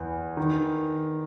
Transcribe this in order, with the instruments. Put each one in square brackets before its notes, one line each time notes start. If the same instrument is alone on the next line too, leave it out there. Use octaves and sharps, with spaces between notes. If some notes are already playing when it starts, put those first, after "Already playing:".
Already playing: [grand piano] E2 E3
D#3